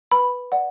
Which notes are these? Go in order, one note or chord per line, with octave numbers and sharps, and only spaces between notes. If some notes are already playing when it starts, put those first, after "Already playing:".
B4 B5
D5 F#5